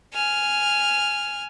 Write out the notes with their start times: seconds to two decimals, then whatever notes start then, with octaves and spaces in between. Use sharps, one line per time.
0.14 G#5 F6